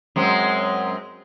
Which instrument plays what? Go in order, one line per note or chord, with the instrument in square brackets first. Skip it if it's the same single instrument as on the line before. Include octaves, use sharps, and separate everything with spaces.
[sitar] F#2 G#3 C4